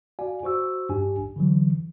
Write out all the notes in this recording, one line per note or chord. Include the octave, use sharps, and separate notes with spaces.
F#4 D5 F5 G#5
F#4 C5 C#6 E6
G2 D4 G4 G#5
A1
D3 E3 F#3